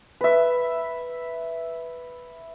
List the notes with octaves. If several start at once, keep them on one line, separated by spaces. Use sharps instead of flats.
B4 E5